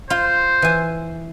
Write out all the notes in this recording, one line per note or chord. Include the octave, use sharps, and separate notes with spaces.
F4 C5
E3 G#5